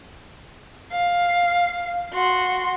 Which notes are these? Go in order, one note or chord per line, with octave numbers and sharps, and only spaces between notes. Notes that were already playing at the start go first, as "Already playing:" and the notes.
F5
F#4 C6